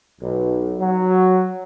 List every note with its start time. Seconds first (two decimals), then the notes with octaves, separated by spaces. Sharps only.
0.21 B1
0.79 F#3